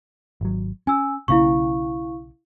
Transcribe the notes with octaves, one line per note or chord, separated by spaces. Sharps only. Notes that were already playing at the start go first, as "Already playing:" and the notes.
G#1 F#3
C#4 G#5 E6
B1 C#3 A#3 E4 F5 C#6